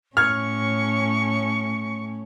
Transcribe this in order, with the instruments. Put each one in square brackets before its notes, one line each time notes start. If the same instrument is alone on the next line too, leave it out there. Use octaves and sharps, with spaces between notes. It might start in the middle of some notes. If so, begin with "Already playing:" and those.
[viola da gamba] A2 C#4 [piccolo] C#6 [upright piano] F6 G#6